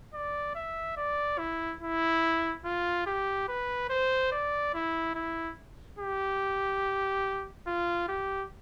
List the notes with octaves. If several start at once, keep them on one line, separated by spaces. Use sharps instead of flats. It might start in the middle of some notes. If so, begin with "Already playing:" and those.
D5
E5
D5
E4
E4
F4
G4
B4
C5
D5
E4
E4
G4
F4
G4